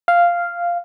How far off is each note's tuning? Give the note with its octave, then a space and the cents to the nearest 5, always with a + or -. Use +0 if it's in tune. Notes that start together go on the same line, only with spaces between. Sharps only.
F5 -5